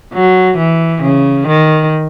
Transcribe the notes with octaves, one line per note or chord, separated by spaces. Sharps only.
F#3
E3
C#3
D#3